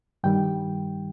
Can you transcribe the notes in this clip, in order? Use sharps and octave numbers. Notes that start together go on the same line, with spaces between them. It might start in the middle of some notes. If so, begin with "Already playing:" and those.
G2 D#3 G3 G5